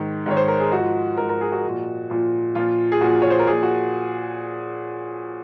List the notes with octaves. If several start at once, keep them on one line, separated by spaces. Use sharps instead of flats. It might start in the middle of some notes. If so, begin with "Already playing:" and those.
Already playing: G#2 D#3
G#2 D#3 C#5
C5
A#4
G#4
G#2 F3 F#4
G#2 F3 A#4
A#4
G#4
F#4
A#2 F3
A#2 F3
A#2 F3 F4
G#4
A#2 F3 F#4
C#5
C5
A#4
A#2 F3 G#4
F#4